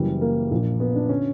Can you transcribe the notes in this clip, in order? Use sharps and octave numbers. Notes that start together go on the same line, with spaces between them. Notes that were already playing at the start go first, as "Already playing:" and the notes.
Already playing: F#1 F#2 E3 G3
A#3
A#1 A#2
B3
D4
D3 C#4